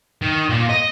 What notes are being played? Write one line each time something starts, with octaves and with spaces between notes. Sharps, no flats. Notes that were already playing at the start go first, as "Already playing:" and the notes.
D#3
A#2
D#5